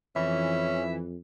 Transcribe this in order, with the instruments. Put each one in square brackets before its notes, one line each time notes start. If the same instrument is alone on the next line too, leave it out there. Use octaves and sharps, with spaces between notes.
[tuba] F2 [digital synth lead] E3 [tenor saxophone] C#4 [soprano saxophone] E5